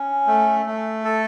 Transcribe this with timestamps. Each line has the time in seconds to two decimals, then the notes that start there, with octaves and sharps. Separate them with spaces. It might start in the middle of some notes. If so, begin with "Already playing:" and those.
Already playing: C#4
0.27 A3
0.66 A3
1.04 A4